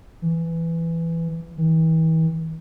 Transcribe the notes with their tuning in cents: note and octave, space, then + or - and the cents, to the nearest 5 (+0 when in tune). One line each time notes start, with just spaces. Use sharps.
E3 +10
E3 -40